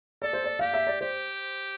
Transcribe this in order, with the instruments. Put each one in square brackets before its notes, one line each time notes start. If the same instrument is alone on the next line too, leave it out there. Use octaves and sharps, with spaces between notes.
[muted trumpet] A4 [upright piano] D5
[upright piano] C5
D5
[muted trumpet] G4 [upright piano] F5
[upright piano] E5
D5
[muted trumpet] G4 [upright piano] C5